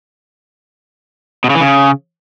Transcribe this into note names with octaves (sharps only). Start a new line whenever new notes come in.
B2
C#3
E3
C#3